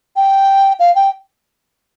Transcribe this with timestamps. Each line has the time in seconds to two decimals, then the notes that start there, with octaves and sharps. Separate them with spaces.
0.16 G5
0.80 F5
0.95 G5